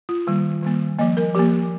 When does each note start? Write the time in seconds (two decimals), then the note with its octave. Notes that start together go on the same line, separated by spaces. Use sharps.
0.09 F4
0.27 D#3 G3 A#3
0.62 D#3 G3 A#3
0.99 F3 A#3 D#5
1.17 A#4
1.34 F3 A#3 G4